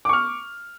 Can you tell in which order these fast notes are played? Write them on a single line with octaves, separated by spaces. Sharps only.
D6 C#6 F6